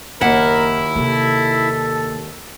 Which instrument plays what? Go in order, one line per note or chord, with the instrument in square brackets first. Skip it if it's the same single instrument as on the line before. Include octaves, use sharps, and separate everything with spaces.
[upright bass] F#1 [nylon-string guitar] D#2 F#5 [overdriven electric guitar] E4 [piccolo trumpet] A#4
[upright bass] C3 A#3 [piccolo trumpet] A4